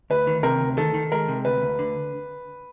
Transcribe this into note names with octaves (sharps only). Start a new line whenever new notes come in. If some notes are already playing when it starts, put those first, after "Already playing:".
D2 B4
D#3
C3 A#4
D2
D#3 A4
D#3
G#3 A#4
C3
D2 B4
D2
D3